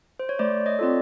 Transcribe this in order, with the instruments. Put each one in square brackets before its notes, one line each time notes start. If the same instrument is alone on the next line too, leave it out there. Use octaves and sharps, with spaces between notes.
[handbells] C5
C#5
A3 C5 D5
C#5 D#5
C4 F4 A4 D5